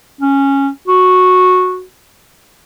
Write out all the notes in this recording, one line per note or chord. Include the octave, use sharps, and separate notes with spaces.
C#4
F#4